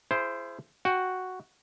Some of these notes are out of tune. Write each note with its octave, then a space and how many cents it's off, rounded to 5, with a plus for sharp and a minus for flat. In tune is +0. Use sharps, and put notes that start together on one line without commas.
E4 +30 G#4 +15 C5 +0
F#4 +0 G5 +10